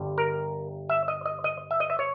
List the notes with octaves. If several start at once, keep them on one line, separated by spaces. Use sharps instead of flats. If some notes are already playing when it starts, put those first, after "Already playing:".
Already playing: G1 G2 G3
A#4
E5
D#5
D#5
D#5
E5
D#5
E5
C#5